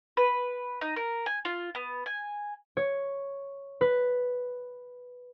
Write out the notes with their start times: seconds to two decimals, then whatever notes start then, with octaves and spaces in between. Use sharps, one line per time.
0.17 B4
0.81 D#4
0.96 A#4
1.26 G#5
1.45 F4
1.75 B3
2.06 G#5
2.77 C#5
3.81 B4